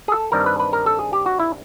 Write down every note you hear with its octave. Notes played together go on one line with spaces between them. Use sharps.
G#4
A4
G2 D#3 G3 C4 A#4
B4
B4
A#4
A4
G#4
G4
F#4
E4